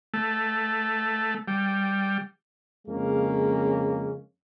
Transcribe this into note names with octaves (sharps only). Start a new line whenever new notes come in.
A3
G3
F2 C#3 G#3 A#3 C#4